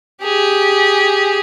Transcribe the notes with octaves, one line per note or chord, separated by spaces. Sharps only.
G4 G#4